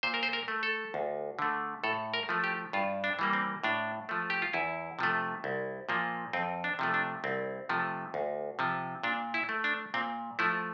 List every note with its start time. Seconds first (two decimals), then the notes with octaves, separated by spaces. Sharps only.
0.03 A#2 C5
0.14 A#4
0.23 C5
0.33 A#4
0.48 A3
0.63 A4
0.94 D2
1.39 D3 A3
1.84 A2 A4
2.14 A#4
2.29 F3 A3
2.44 G4
2.73 G2 F4
3.04 D4
3.19 E3 G3 A#3
3.33 C4
3.64 A2 D4
4.09 F3 A3
4.30 G4
4.42 F4
4.53 E2 E4
4.99 C3 F3 A3
5.44 C2
5.89 A#2 F3 A#3
6.33 F2 C4
6.64 D4
6.79 C3 F3 A3
6.94 D4
7.24 C2 C4
7.69 C3 F3 A3
8.14 D2
8.59 C3 F3
9.03 A#2 D4
9.34 E4
9.49 A3
9.64 D4
9.94 A#2 C4
10.39 F3 A3 E4